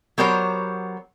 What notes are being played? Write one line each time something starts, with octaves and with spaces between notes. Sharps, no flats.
F#3 B3 G4 A#4 C5 C#5